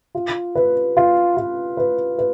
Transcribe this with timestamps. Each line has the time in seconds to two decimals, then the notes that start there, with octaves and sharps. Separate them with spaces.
0.15 F4
0.55 B4
0.97 F4
1.37 F4
1.77 B4
2.18 B4